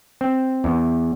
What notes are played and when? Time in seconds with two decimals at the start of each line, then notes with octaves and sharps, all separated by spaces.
0.21 C4
0.64 E2